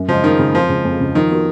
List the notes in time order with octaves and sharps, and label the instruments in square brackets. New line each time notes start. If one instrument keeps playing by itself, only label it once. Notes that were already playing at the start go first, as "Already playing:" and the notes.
Already playing: [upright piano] F#2
[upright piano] C#3 G#3 [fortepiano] F3
[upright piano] F#2 [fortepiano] D#3
[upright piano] C#3 G#3
[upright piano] F2 [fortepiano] F3
[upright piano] C#3 G#3
F2
C#3 G#3
[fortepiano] D#3 [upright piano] F3
[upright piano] B3 F#4 A#4